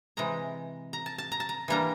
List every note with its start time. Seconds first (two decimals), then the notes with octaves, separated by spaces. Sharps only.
0.17 C3 E3 G#3 A#5
0.93 A#5
1.06 A5
1.18 A5
1.32 A#5
1.40 A5
1.49 A#5
1.68 E3 G3 A#3 D4 A#5